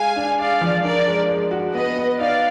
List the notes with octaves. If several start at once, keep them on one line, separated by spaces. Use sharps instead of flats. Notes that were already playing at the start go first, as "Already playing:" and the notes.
Already playing: G#3 F5 G#5
D4
G#3 D5 F5
F3
D4 A#4 D5
G#3
G#3
F#4
B3 B4 D#5
B3
D#4 D5 F5